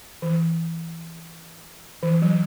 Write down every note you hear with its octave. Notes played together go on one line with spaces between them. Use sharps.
E3
E3
F#3